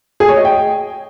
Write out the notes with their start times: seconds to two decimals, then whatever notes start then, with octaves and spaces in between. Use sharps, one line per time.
0.20 G#4
0.28 C#5
0.37 D#5
0.45 G5